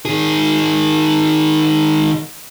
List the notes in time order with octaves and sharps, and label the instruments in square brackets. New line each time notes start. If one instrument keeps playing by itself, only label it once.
[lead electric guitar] D#3 G#4